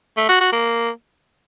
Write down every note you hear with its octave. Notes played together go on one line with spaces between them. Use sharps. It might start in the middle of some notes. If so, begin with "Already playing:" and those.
A3
F#4
F#4
A#3